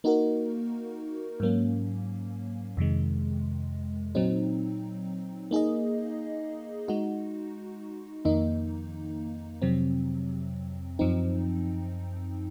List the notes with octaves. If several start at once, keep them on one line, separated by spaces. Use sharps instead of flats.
A#3 D#4 F#4 A#4
G#2 F#3 A#3 C#4
F2 C3 D#3 G#3
A#2 F#3 C4 D#4
A#3 D#4 G#4 D#5
G#3 D#4 F#4
F2 D#3 A#3 D#4
F2 C3 F#3 C4
F#2 F3 C4 D#4